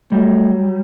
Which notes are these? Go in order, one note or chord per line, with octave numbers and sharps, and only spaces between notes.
F#3 G3 A3